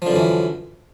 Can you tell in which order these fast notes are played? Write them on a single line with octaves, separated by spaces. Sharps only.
F3 D3 F#2 E3